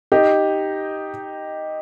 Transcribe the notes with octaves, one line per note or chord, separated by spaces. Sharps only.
D#4 G4